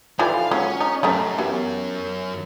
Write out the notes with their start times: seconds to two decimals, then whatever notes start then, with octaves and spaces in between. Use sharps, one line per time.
0.19 E3 F3 G3 D#4 F4 A4 F5
0.51 F#3 G#3 C#4
0.81 D#4
1.03 F#2 G3 A3 D#4
1.39 E3 B3 F#4 G4